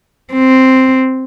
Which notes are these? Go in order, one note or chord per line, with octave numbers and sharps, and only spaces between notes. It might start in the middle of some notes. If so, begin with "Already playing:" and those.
C4